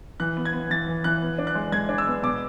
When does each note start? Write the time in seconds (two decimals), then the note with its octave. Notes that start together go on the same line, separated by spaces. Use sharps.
0.20 E3 F#6
0.37 B3
0.45 G#6
0.53 B3
0.70 E3 A6
0.88 E3
1.04 E3 F#6
1.22 B3
1.38 D4
1.47 F#6
1.55 G#3
1.72 G#3 G#6
1.89 D4
1.98 E6
2.07 B3
2.23 B2 D6